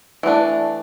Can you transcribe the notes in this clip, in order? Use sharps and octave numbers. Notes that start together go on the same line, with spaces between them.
E3 A3 D4